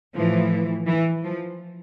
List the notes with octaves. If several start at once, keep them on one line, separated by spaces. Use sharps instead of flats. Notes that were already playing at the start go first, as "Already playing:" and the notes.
A2 E3 F3
E3
F3